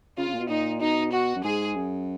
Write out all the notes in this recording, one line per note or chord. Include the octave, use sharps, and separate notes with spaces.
C#3 F4
C#3
A#2
B2
A#2 D#4
B2 D#4
F#4
F#2
G#2 G#4
F#2